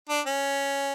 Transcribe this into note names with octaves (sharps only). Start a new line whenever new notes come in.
D4
C#4